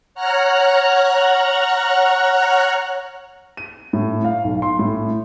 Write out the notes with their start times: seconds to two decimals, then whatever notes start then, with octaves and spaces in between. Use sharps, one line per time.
0.15 C#5 F#5 A#5 F6 F#6
3.57 D#7
3.93 A2
4.25 F5
4.44 B1
4.62 C6
4.79 A2